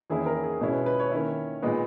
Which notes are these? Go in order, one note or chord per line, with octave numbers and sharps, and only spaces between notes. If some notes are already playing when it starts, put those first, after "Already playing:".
E2 D#3 A#3 C#4 E4 G#4
A#4
G#4
B2 G#3 C#4 E4
B4
B4
C#5
D#3 A#3 C#4 E4
A#2 G#3 B3 D#4